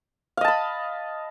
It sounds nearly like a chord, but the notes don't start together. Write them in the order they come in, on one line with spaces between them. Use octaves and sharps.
F5 D#5 A5 B5